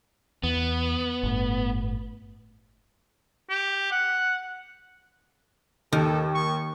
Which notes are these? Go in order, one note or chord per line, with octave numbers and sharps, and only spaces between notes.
E2 B3
G1 A2
G4
F#5
D#2 D#3 A4
C#6